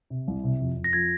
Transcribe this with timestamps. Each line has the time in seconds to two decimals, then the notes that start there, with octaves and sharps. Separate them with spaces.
0.10 C3
0.28 C2
0.44 C3
0.60 F2
0.77 F2
0.84 A#6
0.93 F3 G#6